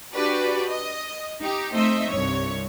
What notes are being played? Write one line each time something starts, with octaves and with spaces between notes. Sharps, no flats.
D4 F#4 G4 B4 D5
D#5
D#4 G4
A3 C4 D#4 C5 D#5 E5
C2 G2 C#5